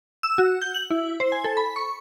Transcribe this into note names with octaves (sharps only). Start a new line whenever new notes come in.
E6
F#4
G6
F#7
E4
C5
G#5
A4
B5
C#6